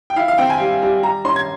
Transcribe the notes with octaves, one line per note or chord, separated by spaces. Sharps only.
G5
E4 F5
F5
C4 G5
G#5
G3
G3
G3 A#5
C#4 C6
G#6